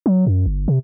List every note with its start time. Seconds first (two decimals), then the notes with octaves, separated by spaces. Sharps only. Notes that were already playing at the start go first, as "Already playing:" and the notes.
0.06 F#3
0.27 F#2
0.46 G1
0.68 C3